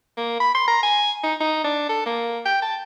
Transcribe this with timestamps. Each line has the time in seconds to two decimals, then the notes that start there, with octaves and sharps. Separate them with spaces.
0.17 A#3
0.40 B5
0.55 C6
0.68 A#5
0.83 G#5
1.24 D#4
1.41 D#4
1.64 D4
1.89 A4
2.06 A#3
2.46 G5
2.62 A5